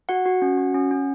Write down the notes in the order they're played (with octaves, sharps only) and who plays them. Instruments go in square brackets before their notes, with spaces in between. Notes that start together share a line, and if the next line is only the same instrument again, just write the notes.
[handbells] F#4 F#5
F#4
C#4
F#4
C#4
C#4